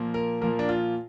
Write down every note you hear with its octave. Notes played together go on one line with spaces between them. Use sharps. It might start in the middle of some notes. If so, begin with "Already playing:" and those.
Already playing: A#2 F3 A#3
A#4
A#2 F3 A#3 A#4
D4
F4